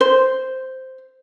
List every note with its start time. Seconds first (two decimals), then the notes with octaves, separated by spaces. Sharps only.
0.01 C5